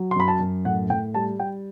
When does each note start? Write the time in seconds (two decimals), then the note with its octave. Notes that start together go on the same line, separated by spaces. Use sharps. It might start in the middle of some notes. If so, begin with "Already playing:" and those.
Already playing: F#3
0.11 C6
0.16 F#2 B5
0.28 A5
0.40 F#2
0.65 A2 F#5
0.90 A2 G5
1.14 G3 A5
1.39 G3 G5